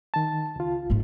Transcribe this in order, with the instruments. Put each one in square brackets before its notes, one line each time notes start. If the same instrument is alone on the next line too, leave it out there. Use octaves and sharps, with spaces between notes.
[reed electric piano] D#3 A5
C#2 F4
[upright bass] G#2 A3